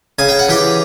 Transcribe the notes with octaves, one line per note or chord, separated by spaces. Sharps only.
C#3 G#5
G5
F#5
E3 G4 G5